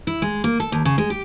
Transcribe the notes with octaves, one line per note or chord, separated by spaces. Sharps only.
E4
G#3
A#3
A4
D#2
C#3
G#3
G4